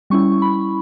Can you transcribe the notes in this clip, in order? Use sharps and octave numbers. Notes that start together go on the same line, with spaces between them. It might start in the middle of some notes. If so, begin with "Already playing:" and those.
G3 C#4 E4 C#6
B5